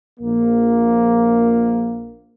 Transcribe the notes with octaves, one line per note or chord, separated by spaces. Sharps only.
A#1 A#3